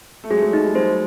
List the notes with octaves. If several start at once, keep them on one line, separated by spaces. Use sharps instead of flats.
A3
F#3 G#3 G#4
A3
F#3 G#3
D#4
G3
F#3 G#3 C5